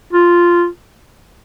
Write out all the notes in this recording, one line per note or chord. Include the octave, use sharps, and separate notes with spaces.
F4